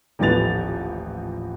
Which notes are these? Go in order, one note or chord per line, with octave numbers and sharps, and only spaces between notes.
D#1 A1 F3 B3 A6 F7